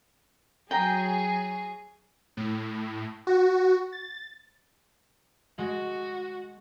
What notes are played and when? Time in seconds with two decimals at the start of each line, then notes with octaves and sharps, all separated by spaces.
0.71 F#3 G#4 G5 A#5
2.37 A2
3.27 F#4
3.92 A6
5.58 G#3 F#4